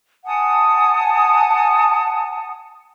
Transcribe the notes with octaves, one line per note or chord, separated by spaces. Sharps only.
F#5 G#5 A5 D#6